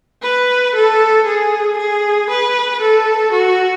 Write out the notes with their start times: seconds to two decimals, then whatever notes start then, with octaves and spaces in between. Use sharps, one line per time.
0.22 B4
0.75 A4
1.26 G#4
1.78 G#4
2.30 B4
2.81 A4
3.32 F#4